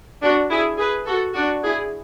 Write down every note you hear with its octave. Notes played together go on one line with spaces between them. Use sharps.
D4 F#4
E4 G#4
G#4 B4
F#4 A4
D4 F#4
E4 G#4